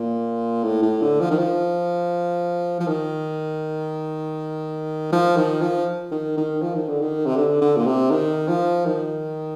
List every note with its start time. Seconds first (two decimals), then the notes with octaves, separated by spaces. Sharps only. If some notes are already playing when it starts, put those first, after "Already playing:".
Already playing: A#2
0.63 A2
0.82 A2
1.02 D3
1.20 F3
1.31 D#3
1.39 F3
2.80 F3
2.88 D#3
5.12 F3
5.36 D#3
5.62 F3
6.11 D#3
6.37 D#3
6.62 F3
6.75 D#3
6.89 D3
7.01 D#3
7.26 C3
7.36 D3
7.61 D3
7.77 A#2
7.87 C3
8.11 D#3
8.48 F3
8.86 D#3